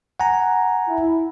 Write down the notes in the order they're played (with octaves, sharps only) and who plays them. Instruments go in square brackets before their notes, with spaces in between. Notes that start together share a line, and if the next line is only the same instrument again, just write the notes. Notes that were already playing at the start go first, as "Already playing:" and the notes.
[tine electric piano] F#5 G#5 A#5
[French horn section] E4